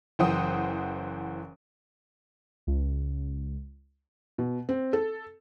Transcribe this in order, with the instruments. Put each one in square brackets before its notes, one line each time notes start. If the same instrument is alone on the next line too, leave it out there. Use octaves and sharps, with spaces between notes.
[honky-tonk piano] F#1 E3 C5 F#5 G5 D#6
[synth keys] C#2
[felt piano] B2
C4
A4